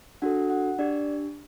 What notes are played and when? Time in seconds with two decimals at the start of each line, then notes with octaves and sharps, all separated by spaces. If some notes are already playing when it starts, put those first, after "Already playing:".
0.22 D4 F#4 A4 F#5
0.50 F#5
0.79 D4 G4 D5